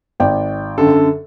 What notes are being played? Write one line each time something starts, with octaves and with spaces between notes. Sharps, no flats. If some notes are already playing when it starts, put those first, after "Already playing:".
G#1 D5 G5
F#2 D3 A4